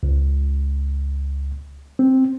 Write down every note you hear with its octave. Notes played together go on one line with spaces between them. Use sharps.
C#2
C4